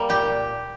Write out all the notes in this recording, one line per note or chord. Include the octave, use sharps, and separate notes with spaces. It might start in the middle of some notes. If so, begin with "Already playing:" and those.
Already playing: G3 A#3
A#2 G4